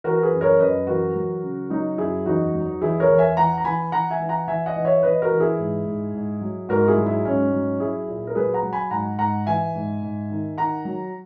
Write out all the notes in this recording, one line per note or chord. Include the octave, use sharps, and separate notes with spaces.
E3 F#4 A#4
G#4 B4
F#2
A#4 C#5
F#2 B4 D#5
E3 F#4 A#4
F#3
C#3
F#3 D#4 F#4
F#2 E4 G#4
E2 D#4 F#4
F#3
E2 E4 G#4
A#4 C#5
E2
E5 G#5
E3 F#5 A#5
A#5
E3 G#5 B5
E3 F#5 A#5
E5 G#5
E3
F#5 A#5
E3 E5 G#5
D#5 F#5
E3
C#5 E5
E3 B4 D#5
F#4 A#4
E3
E4 G#4
G#2
G#2
G#2
F#3
G#2 F#4 A#4
E4 G#4
F#3
E4 G#4
G#2 C#4
F#3
F#3 E4 G#4
A#2
A#4
F#3 G#4 B4
F#5 A#5
F#3
G#5 B5
G#2 F#5 A#5
G#2 F#5 A#5
E3 E5 G#5
G#2
G#2
D#3
D#3 F#5 A#5
F#3